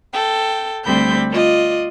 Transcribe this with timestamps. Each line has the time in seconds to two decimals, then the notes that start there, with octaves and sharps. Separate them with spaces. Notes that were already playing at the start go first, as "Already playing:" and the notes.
0.12 A4 G5
0.84 D2 G3 C4 B5 G6
1.30 F4 D5 D#5